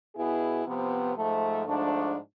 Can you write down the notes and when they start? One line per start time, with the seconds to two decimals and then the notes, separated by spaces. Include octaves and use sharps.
0.15 B2 B3 E4 G#4
0.64 C3 F3 B3
1.15 G#2 F3 A3
1.65 G#2 F3 A3 D4